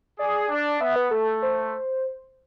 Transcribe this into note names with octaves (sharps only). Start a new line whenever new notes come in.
G#4 D5
D4
B3 E5
B4
A3 A4
C5